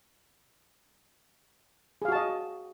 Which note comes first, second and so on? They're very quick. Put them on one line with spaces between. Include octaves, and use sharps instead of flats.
G#4 F5 F#4 A5 D#5